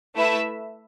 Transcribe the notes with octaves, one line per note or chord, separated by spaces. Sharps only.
A3 E4 B4 E5